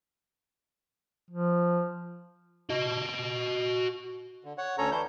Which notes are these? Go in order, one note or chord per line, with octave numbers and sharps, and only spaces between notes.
F3
F#4 D#5
D3
C#5 F#5
D2 C#4 A4 C#5 A#5
E3 D4 E4 G6